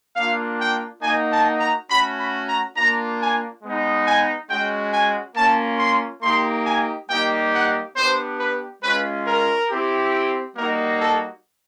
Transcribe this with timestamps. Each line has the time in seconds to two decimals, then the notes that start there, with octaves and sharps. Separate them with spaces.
0.16 A#3 D4 F4 F5
0.59 G5
1.02 A#3 D#4 F#4 G#5
1.32 A5
1.60 A#5
1.90 A3 C#4 F#4 B5
2.18 B5
2.47 A#5
2.76 A#3 D4 F4 A#5
3.20 G#5
3.63 G#3 B3 D#4
4.06 G#5
4.49 G#3 C#4 F#4 G5
4.93 G#5
5.36 A#3 C#4 F4 A5
5.79 C6
6.22 A#3 D#4 G4 C6
6.66 G#5
7.09 G3 A#3 D#4 G4 G5
7.53 F#5
7.96 B3 D4 G4 C5
8.39 B4
8.83 G#3 C#4 F4 B4
9.26 A#4
9.70 C4 E4 G4
10.56 G3 A#3 D#4 F#4 A#4
11.00 A4